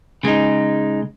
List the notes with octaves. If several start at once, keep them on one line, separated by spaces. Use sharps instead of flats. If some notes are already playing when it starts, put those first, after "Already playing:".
C#3 G#3 D#4